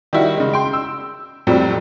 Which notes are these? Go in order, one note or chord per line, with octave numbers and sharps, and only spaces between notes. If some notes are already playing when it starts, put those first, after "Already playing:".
D#3 G3 E4 F#4
C#3 G#3
G5 C6
E6
F2 A2 F#3 G3 C4